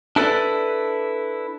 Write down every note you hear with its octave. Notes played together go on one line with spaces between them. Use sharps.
D4 E4 A4 B4 D5